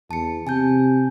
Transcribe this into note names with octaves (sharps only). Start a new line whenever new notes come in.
E2 A5 C#7
C3 G#5 A5 G6